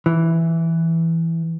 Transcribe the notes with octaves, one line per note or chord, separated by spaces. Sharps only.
E3